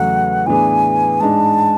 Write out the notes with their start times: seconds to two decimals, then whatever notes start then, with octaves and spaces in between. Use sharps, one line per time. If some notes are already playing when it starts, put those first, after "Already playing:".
Already playing: E2 C#3 F#3 A3 F#5
0.46 A2 E3 B3 D4 G#4 G#5
1.20 G#2 G#3 D4 A5